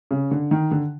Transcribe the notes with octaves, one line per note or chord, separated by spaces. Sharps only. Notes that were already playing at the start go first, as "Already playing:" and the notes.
C#3
D3
D#3
D3